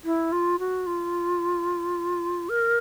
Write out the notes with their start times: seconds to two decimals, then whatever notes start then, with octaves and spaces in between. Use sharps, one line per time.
0.04 E4
0.32 F4
0.59 F#4
0.87 F4
2.49 A#4